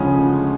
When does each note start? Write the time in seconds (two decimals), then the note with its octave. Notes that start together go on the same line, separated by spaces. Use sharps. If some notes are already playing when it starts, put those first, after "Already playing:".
Already playing: D2 C#3 F3 G#3 C#4